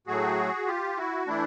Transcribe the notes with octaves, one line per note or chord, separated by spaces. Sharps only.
A2 F#3 A3 F#4 G#4
F4 G4
E4 F#4
E3 A3 D4 E4